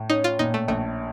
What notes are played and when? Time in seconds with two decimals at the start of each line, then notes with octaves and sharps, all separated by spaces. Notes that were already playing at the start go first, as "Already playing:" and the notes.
Already playing: A2
0.10 C#4 D#4
0.24 F4
0.39 A#2 D#4
0.54 A3
0.68 A#1 A3